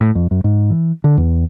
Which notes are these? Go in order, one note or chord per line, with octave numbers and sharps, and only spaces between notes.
A2
F2
F#2
G#2
E3
D3
E2